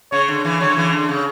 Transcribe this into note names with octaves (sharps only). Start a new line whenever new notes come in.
C#3 C#5
D3
C#3 E3
D3 F#3 C#5
C#3 E3
D3
C#3